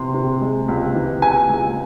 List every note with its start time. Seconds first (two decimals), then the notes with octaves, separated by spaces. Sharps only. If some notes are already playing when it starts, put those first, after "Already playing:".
Already playing: C3 E3 C6
0.14 C3
0.41 G#3
0.68 C#2
0.95 E3
1.22 E3 G#5
1.49 C#2